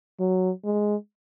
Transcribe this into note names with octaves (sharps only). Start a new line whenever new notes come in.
F#3
G#3